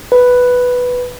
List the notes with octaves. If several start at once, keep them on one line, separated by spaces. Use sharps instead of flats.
B4